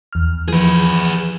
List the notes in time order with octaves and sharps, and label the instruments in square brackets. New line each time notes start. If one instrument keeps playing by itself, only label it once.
[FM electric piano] E2 F6
[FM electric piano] E3 F3 [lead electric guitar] G#4 B4